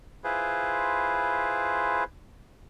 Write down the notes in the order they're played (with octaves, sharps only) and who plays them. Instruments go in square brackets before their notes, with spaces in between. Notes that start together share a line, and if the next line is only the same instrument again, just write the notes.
[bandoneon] E4 F4 G#4 B4 C5